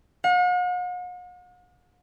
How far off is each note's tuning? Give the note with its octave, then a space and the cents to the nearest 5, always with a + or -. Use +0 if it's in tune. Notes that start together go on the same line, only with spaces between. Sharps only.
F#5 -45